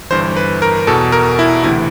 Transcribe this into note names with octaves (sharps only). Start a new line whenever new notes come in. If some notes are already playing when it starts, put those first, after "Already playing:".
G1 G2 E3 C5
B4
A#4
E2 B2 A4
A#4
E4
D2 C3 E3 E4